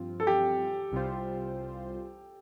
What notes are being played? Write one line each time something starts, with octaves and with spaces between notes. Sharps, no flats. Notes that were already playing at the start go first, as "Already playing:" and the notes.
Already playing: G2 F3 C4 F4
A4
G4
C2 C3 G3 F4 C5